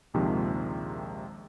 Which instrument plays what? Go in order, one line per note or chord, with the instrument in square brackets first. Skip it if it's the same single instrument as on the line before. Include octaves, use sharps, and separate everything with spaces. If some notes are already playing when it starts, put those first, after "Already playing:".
[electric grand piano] A#1 D#2 C3 D#3 F3 G#3